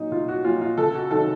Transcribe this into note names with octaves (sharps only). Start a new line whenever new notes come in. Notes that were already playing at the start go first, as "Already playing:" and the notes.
Already playing: A#2 F#3 D#4
C2 F4
F#4
A#2 F#3 F4
F4
C#2 A4
F#4
C3 D#3 F#3 A4